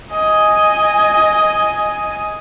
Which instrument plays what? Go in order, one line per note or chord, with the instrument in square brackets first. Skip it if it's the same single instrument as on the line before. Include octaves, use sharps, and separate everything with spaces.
[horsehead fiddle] D#5 G#5